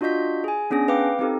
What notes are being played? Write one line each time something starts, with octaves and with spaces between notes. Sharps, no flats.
D4 F4 F#4 D#5 G6 B6
G#4 G#5
B3 C#4 D4 G#4 A#6
B4 F5 G5 D6
C4 D#4 G4 A4